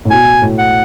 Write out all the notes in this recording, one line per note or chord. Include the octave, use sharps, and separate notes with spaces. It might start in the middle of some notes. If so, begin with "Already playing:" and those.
A2
B2 G#5
A2
F#5